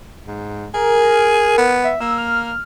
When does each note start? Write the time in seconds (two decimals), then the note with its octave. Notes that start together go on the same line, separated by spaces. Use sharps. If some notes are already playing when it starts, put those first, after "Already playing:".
0.27 G#2
0.74 G#4 A#4
1.58 B3
1.84 E5
2.01 A#3 E6
2.18 F6